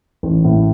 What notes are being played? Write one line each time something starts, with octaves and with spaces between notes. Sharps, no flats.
A1
A2